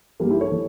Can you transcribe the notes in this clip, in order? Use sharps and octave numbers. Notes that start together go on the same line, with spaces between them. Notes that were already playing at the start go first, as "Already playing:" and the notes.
G2 E3 G3 A#3
E4 G4
A4 C#5
E3